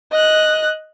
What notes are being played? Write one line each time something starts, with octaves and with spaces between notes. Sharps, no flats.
D#5 F#6